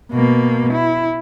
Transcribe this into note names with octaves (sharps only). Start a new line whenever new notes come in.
B2 A#3
E4